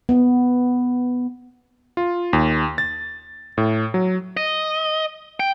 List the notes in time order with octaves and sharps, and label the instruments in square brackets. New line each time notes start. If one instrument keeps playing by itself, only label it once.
[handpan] B3
[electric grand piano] F4
D#2
A6
A2
F#3
[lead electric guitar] D#5
G5